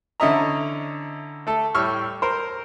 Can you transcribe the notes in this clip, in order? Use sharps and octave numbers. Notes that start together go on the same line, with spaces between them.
D3 C#4 E4 D#5 E5 A#5
A3 A4
A2 G3 C#6 E6 F6
A#4 C5